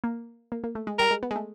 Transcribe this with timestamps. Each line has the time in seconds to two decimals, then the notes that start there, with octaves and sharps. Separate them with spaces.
0.04 A#3
0.52 A#3
0.64 A#3
0.75 A3
0.87 G#3
0.99 G3 A#4
1.11 G#3
1.23 B3
1.31 G#3
1.36 A3